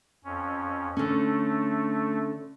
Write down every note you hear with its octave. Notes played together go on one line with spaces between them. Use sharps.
F2 C#4
D3 A3 C#4